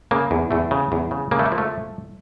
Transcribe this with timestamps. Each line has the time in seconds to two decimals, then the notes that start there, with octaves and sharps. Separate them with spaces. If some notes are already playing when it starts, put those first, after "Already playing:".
0.11 C#3 A#3
0.31 E2
0.51 E2 A3
0.71 C#3
0.92 E2
1.11 C#3
1.31 C#3 A#3
1.39 A3
1.46 A#3
1.52 F3
1.58 A3